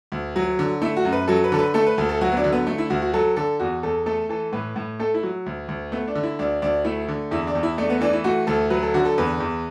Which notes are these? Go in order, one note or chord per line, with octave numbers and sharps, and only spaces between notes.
D2
F#3
D3
A3 E4
F#4
F#2
B4
F#3 A4
B4
D3 A4
B4
A3 A4
B4
D2 A4
A4
F#3 F#4
B3
D4
D3
B3
A3
E4
D2 F#4
F#4
F#3 A4
D3 A4
E2 F#4
E2 A4
A3 A4
E3 A4
A2 B4
A2
A3 A4
E4
F#3
D2
D2
A3 B3
D4
D3
E4
D2 D4
D2 D4
A3 E4
D3
E2 E4
D4
E2
E4
A3 D4
B3
E3 D4
E4
A3 F#4
D2 A4
F#3 B4
A4
D3 F#4
A4
E2 B4
E2